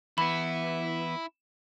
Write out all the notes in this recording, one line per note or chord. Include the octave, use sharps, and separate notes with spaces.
E3 B3 E4 B5